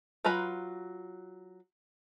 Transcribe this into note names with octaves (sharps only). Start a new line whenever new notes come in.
F#3 F4 B4 A#5 B5